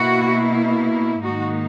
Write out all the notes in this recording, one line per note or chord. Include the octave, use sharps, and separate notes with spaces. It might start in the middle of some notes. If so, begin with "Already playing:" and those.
Already playing: B2 A#3 E4 F#4
G#2 D#3 A#3 D#4 F#4